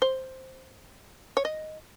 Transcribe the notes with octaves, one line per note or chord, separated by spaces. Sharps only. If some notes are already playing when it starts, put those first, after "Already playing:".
C5
C#5
D#5